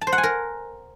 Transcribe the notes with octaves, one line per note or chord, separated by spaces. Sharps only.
A5
C5
F#5
G#5
A#4